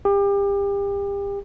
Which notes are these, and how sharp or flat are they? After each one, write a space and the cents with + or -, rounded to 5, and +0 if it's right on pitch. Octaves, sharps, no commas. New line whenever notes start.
G4 +35